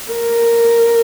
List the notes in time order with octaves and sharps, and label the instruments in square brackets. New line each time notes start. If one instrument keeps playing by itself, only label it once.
[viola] A#4